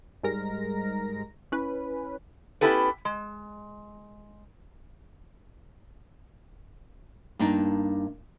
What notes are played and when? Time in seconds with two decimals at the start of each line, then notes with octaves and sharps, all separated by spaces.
0.23 G#2 G3 G#3 A#4 A#6
1.52 C#4 E4 B4
2.61 B3 C#4 E4 G4 A4 B4
3.05 G#3
7.39 G2 A#3 D4 D#4